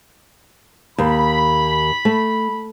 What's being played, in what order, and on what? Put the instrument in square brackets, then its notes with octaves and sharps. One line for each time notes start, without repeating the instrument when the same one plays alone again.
[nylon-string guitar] D#2 [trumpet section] B5
[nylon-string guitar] A3